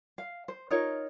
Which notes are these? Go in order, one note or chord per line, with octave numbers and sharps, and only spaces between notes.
F5
C5
D#4 F4 A#4 C#5